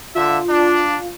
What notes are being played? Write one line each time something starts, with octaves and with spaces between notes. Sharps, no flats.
D3 F4 E5
D4